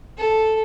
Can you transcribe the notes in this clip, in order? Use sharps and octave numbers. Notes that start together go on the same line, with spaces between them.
A4